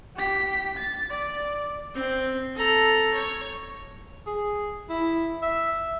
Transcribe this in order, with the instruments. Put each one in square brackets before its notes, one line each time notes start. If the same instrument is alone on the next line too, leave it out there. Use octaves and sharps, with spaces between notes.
[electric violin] G4 B6
A6
D5
[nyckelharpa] C4
A4 A#5
C#5
[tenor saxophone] G#4
E4
E5